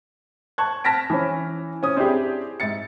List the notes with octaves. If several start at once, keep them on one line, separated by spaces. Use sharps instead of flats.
A5 C#6 F#6 G#6
A5 F6 A#6 B6 D7
E3 C#4
C#4 D#6
C4 D4 E4 G4 G#4
G#2 E5 A6 C#7